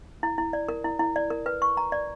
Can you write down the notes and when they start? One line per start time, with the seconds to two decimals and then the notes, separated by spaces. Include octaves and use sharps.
0.23 E4
0.38 E4
0.53 D5
0.69 A#4
0.84 E4
0.99 E4
1.16 D5
1.30 A#4
1.46 B4
1.62 C#6
1.77 A#5
1.92 D5